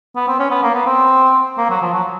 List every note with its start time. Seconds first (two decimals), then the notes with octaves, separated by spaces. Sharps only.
0.16 B3
0.28 C4
0.39 C#4
0.51 B3
0.63 A#3
0.75 B3
0.87 C4
1.58 A#3
1.70 F#3
1.82 F3
1.94 F#3